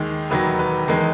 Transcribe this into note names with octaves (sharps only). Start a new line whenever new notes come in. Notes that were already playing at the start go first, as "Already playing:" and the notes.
Already playing: D#2 D#3 G#3
E1 D#2 D#3 F#3 B4
B4
E2 D#3 G#3